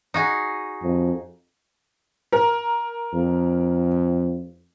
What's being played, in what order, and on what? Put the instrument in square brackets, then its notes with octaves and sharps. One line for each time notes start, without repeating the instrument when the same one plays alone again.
[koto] D#4 F#4 G#4
[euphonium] F2
[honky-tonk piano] A#4
[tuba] F2